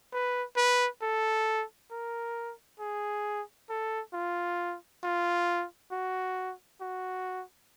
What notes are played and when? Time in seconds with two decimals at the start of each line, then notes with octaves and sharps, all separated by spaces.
0.13 B4
0.57 B4
1.02 A4
1.92 A#4
2.79 G#4
3.70 A4
4.13 F4
5.04 F4
5.92 F#4
6.81 F#4